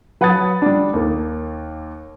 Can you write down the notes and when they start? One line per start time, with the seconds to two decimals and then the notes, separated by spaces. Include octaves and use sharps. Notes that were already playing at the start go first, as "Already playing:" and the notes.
0.21 F#3 B4 F#5 A5 D#6 A6
0.62 G3 D4
0.94 D#2 A#3